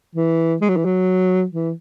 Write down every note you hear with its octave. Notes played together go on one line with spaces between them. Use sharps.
E3
G#3
F#3
E3
F#3
E3